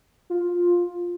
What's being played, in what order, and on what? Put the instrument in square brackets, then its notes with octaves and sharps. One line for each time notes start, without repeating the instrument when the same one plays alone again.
[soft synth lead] F4